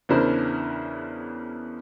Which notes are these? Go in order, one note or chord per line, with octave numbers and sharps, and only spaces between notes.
E2 C#3 D4 E4 A#4 C5